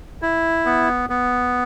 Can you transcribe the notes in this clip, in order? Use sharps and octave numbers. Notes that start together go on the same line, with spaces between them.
E4
B3
B3